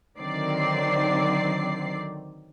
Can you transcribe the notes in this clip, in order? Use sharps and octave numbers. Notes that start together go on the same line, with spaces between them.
D3 D#3 F#3 C4 D5 C7